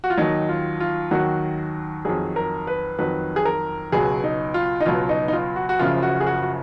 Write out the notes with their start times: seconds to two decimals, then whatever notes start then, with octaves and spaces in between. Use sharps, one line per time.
0.04 F#4
0.10 F4
0.17 D#2 D#3 F#3 D#4
0.49 F4
0.80 F4
1.11 D#2 D#3 F#3 F#4
2.05 F2 D#3 F#3 G#4
2.36 A#4
2.67 B4
2.98 F2 D#3 F#3 B4
3.36 G#4
3.45 A#4
3.92 C#2 B2 F#3 G#4
4.24 D#4
4.54 F4
4.81 D#4
4.86 C#2 B2 F#3 F4
5.09 D#4
5.28 D#4
5.33 F4
5.56 F#4
5.69 F#4
5.79 F#1 F#2 C#3 F3 F4
6.03 F#4
6.20 G#4
6.27 F#4
6.42 F#4